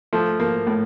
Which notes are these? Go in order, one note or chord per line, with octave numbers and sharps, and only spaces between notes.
F3 A3
F3 A#3
A2